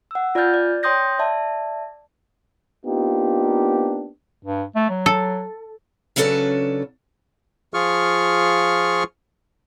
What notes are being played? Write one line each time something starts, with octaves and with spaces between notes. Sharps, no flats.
F#5 E6
F4 D5 G#5 F6 G6 A6
D5
C#5 G5 C6 D#6 G6 A#6
D5 E5 A5
A#3 B3 D4 D#4 F4 G4
G2
A3
F#3
A4
C#3 F#3 C#4 D4 A4 B4
F3 F4 G#4 C#6 F6